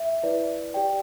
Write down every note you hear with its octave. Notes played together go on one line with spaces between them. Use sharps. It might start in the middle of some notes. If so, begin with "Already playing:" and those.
Already playing: E5
E4 B4 D5
G4 D5 G5